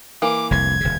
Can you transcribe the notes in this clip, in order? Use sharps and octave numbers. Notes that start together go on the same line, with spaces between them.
E3 A#3 D6
F1 C2 C3 G#6
D#1 D2 C#3